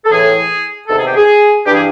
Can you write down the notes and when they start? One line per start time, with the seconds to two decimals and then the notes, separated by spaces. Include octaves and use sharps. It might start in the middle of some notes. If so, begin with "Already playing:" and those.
0.05 A4
0.11 A2 E3 G#4
0.88 E2 C3 D#3 A4
0.97 G#4
1.06 G4
1.15 G#4
1.65 G2 E3 G4
1.74 G#4